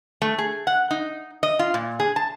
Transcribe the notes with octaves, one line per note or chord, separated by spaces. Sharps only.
A3
G#4
F#5
D#4
D#5
F4
A#2
G#4
A5